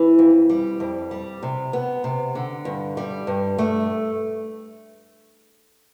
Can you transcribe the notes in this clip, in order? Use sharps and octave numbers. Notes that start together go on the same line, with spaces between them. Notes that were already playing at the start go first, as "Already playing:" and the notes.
Already playing: E3
F2
G3
F2
G3
C3
B3
C3
D3
G2
G3
G2
A3